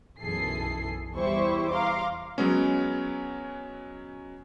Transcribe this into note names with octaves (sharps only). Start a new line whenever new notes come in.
B1 F#2 E3 G#4 A4 C7
E2 G3 E4 G4 C5 C#6
F5 A#5 C6 D6
F#3 G#3 B3 C#4